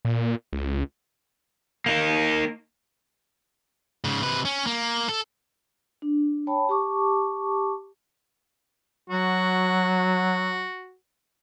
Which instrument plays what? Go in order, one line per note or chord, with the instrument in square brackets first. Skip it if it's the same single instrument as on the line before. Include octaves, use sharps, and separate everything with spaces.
[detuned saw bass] A#2
C#2
[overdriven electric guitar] A#3 D#4
[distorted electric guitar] G#2 C#3
C3 B4
C#4
A#3
A4
[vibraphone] D4
C#5 G5 A5 B5
G4 A5 C#6 D6
[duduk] F#3 [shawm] F#4